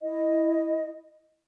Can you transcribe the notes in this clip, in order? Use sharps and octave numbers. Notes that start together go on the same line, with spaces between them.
E4 D#5